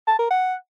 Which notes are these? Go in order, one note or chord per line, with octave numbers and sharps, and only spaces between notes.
A5
A#4
F#5